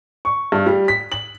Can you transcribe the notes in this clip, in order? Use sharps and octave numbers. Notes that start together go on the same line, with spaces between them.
C#6
G2
G3
B6
F#7